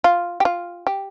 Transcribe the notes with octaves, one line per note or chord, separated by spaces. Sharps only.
F4
G4
F4
G4